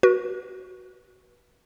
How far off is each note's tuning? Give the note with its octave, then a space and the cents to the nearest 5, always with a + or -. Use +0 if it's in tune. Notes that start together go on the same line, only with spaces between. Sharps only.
F#4 +0 B4 -40